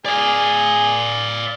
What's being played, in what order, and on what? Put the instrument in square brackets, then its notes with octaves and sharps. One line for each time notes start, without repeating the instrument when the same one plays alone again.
[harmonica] G#4 [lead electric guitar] D5 F5